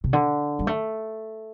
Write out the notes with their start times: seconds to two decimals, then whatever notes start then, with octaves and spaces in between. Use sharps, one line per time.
0.04 C3
0.13 D3
0.59 G3
0.67 A3